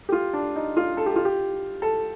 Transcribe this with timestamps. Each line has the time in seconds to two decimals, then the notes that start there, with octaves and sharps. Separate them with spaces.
0.09 G4
0.12 F4
0.33 D4
0.56 D#4
0.77 F4
0.97 A4
1.06 G4
1.16 F4
1.25 G4
1.82 A4